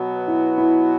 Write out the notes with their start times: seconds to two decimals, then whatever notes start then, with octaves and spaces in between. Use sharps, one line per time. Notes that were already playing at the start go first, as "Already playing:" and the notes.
Already playing: B2 F#3 B3 F#4
0.28 E4
0.58 E4